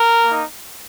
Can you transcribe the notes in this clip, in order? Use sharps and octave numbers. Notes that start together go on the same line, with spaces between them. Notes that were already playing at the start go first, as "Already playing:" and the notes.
Already playing: A#4
A#3 D#4